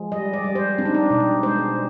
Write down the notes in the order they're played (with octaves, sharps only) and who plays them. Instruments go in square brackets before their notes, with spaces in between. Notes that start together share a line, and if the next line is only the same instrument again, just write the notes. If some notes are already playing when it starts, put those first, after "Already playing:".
Already playing: [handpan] F3 G#3
G3 D#5
D5
G3
C5
C4 D4
D#4
D4
B2
G#3 C5